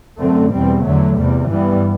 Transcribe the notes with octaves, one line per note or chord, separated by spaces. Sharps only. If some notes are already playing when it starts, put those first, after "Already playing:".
F#2 D3 A3 C4
E2 B2 G3 C4
E2 D3 F#3 A3
E2 C3 G3
G2 E3 G3 B3